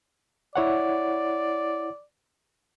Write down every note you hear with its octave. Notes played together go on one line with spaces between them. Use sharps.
E4 C#5 D5 F#5